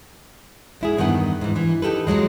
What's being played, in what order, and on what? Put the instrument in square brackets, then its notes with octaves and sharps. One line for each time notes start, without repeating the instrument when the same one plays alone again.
[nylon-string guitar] G#2 E4 G#4
E2 G2 D#3 B3 F#5
G#2 E3
E3
D#4 G4 A4 B4
F2 D3 F#3 G#3